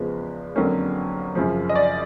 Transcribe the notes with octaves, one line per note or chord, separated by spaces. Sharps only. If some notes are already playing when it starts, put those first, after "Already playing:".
Already playing: E2 C#3 F3 G#3 B4
F2 D3 F#3 A#3 C#4
F#2 C#3 F3
D#5
D5